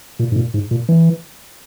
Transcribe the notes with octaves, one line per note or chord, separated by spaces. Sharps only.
A#2
G#2
A#2
G#2
A#2
E3